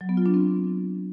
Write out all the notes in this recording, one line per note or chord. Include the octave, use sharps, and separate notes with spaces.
F#3
B3
F4
D4
C4